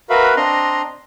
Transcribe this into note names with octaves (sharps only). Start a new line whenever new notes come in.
F#4 A#4 B4 E5 F5 B5
C4 D4 D#5 A#5 C6